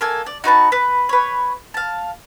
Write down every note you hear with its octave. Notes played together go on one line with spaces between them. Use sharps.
A#3 A4 G#5
D5
D#4 F#4 B4 A5
B4
B4 C#5
F5 A5